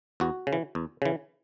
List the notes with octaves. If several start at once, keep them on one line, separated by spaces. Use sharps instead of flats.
E2 F#4
C#3
E3
E2
C#3 E3